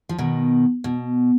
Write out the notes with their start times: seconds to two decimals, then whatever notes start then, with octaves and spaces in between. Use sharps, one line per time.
0.09 F3
0.18 B2 D#3
0.84 B2